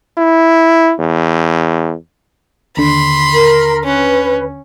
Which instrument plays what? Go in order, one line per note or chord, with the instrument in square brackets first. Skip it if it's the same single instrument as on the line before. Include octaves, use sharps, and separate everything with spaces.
[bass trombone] E4
E2
[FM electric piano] D#2 D3 [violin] B5 C6
[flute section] A#4
[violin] C#4 [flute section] B4